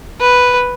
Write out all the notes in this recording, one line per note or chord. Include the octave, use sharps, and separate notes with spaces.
B4